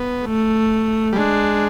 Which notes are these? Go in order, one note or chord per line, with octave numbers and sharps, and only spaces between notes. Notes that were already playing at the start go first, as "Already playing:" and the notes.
Already playing: B3
A3
G3
G#3 D4